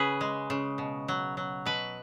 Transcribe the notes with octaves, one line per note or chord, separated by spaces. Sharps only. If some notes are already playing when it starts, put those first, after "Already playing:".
Already playing: C#3 G#4 B4
G#3
C#3
B2
F#3
F#3
B2 B4